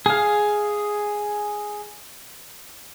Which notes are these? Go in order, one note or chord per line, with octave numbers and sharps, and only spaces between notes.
G#4 F5